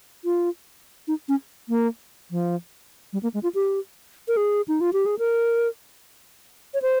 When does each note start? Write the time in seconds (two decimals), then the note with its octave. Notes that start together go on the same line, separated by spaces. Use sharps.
0.25 F4
1.08 D#4
1.28 C#4
1.69 A#3
2.31 F3
3.13 G3
3.23 A#3
3.34 G#3
3.43 F4
3.55 G4
4.28 A#4
4.37 G#4
4.68 D#4
4.81 F4
4.93 G4
5.06 G#4
5.19 A#4
6.74 C#5
6.82 C5